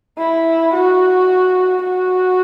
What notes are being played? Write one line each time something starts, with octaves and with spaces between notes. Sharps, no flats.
E4
F#4
F#4